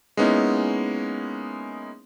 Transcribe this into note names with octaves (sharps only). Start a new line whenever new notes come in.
G#3 A#3 B3 C#4 D#4 E4